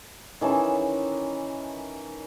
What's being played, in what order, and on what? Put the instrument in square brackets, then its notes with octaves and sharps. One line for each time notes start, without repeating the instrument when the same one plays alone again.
[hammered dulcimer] D#3 E3 C#4 A5